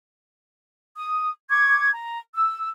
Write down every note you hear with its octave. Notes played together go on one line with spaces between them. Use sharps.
D#6
C#6 D6 G#6
A#5
E6